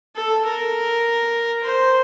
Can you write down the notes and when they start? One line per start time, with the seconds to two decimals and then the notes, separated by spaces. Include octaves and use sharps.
0.15 A4
0.45 A#4
1.63 C5